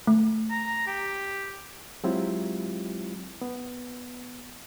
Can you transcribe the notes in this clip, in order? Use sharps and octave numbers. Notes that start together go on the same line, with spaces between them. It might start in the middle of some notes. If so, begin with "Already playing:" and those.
A3
A#5
G4
F#3 G#3 C4 E4 F4 G4
B3